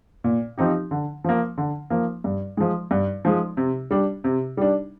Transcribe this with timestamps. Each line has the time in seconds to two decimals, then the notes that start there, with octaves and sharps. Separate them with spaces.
0.24 A#2
0.58 F3 C4 D#4 G4
0.91 D3
1.24 F3 A#3
1.58 D3
1.90 F3 A#3
2.24 G2
2.57 F3 G#3
2.91 G2
3.25 F3 G#3
3.57 C3
3.91 G3 D4
4.24 C3
4.57 G3 D4